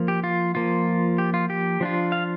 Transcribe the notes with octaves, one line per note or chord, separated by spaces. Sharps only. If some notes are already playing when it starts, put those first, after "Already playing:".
Already playing: F3 A#3
G4
F4
F3 A#3 F4
G4
F4
G4
F3 D4 F4
F5